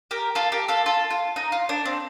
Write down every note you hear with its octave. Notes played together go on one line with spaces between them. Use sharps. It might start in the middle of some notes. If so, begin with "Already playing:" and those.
G4 A#4
F4 A4
G4 A#4
F4 A4
F4 A4
F4
D#4
F4
D4
C4